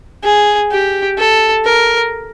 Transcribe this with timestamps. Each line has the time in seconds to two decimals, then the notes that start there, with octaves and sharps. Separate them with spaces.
0.24 G#4
0.72 G4
1.19 A4
1.65 A#4